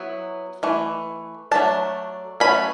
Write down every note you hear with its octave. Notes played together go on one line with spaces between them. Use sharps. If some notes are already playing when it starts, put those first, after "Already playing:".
Already playing: F#3 B3 E4
E3 A3
F#3 A3 D4 A5
F#3 A3 C#4 B5